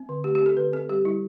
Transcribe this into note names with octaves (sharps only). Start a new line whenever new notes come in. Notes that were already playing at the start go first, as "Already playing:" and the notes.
Already playing: C4
D3
A3 G4
G4
C4
A4
D3 B4
C4 A4
G3 G4
G3 E4